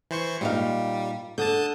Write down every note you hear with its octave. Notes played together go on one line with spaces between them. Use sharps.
E3 C5 C#6
A#2 G3 D#4 F5
D3 A5 D#6 G6